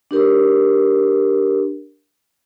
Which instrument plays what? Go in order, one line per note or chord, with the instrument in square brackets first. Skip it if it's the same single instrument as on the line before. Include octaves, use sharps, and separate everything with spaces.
[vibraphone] D4 G4 A#4